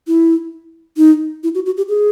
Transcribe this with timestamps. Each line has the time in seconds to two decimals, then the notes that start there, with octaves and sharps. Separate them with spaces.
0.08 E4
0.97 D#4
1.44 E4
1.55 F#4
1.66 F#4
1.77 G4
1.89 G#4